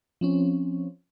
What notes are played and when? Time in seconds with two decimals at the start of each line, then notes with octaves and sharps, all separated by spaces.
0.21 F3 C4 C#4